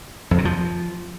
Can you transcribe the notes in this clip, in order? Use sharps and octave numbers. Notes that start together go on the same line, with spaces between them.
F2
C3
F3